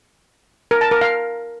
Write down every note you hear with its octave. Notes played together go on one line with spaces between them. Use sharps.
A#4
A5
A#4
F5